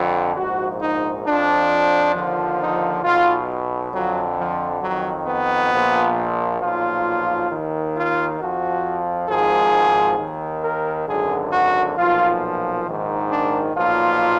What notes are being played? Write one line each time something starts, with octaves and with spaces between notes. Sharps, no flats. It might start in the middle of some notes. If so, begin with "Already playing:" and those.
Already playing: F2 D3 F3
A#1 G#2 F3 F#4
D#4
F2 F3 D4
D#2 D3 F3
D#4
B1 B2 F4
F2 D3 F3 F#3
F3
F2 D#3 F#3
B3
A#1 A#2 F3
B1 A#2 F3 F4
D#2 D#3
F4
F2 F3 F#4
G#1 G#2 F3 G#4
D#2 D#3
A#4
G#1 F#2 D3 G#4
F#4
B1 A#2 F3 F4
A#1 G#2 D#3
D4
B1 A#2 F3 F4